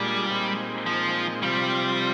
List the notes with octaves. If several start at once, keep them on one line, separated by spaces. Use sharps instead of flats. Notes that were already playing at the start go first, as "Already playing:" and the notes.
Already playing: A#2 G3 G#3 D4 F4
A#2 G#3 C4 D#4
F3
C3 F3 G3 C4 F4